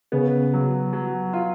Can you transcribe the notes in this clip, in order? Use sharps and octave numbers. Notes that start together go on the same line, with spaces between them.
C#3 B3
F#3
F#3
F4